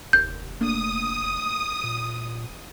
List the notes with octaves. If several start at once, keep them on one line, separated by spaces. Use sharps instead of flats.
F1 D#2 G6
A3 A#3 D4 D#6
A#2